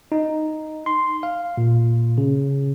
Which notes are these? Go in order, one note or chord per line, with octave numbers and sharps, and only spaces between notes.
D#4
C6
F5
A#2
C#3